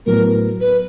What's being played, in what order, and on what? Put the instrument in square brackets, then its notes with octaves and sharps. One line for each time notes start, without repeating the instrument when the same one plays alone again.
[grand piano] A2 F#3 B3 [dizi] A#4
[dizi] B4